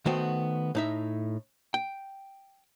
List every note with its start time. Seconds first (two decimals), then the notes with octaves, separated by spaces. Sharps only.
0.06 D#3 A3 B3 F#4 C5 G5
0.75 A2 D#4 E5
1.74 G5